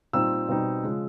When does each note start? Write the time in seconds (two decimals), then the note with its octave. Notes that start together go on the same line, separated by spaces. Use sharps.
0.13 A#2 G3 C4 D#4 E6
0.48 B2 G3 C4 D#4
0.83 C#3 F3 G#3